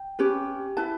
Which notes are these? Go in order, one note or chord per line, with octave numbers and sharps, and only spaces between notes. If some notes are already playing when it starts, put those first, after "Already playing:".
Already playing: G5
C#4 G4 B4
E4 B4 A5